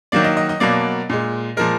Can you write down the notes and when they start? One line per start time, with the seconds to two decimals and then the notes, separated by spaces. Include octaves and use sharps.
0.12 D#3 F#3 A#3 D5
0.24 D#5
0.37 D#5
0.49 D#5
0.60 B2 F#3 A#3 D5
1.10 A#2 G#3
1.57 A#2 F3 G#3 A#4